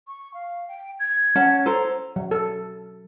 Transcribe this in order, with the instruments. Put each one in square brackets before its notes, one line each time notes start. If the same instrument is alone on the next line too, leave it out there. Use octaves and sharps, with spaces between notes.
[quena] C#6
F5
G5
G#6
[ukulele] C#4 F#5 A5
[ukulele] A4 C5 [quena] A#5
[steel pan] F#3
A4